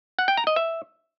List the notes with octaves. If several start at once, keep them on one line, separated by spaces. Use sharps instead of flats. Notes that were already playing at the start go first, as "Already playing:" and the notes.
F#5
G5
A#5
D#5
E5